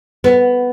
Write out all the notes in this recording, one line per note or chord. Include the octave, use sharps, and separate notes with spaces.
B3